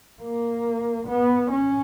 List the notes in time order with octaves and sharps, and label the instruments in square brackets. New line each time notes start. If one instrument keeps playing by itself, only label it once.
[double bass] A#3
B3
C#4